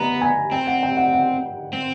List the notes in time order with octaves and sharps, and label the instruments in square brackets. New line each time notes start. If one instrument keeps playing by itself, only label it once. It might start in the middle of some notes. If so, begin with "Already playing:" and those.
Already playing: [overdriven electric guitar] B3 [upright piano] A#5 B5
[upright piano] G#5
[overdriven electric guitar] C4 [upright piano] G5
[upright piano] F#5
G5
F#5
F#5
[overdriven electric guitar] C4